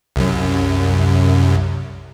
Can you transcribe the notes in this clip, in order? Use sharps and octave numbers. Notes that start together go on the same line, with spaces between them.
C2 F#2